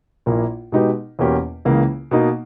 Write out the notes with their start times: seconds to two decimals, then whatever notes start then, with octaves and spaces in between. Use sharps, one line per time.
0.26 A#1 A#2 A#3 E4
0.72 B2 G#3 D#4 G4 B4
1.19 E2 B2 A#3 C#4 G4
1.65 C#2 C#3 E3 A#3
2.11 B2 A#3 D#4